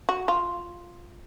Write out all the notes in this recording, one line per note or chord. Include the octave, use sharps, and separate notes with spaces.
F#4
F4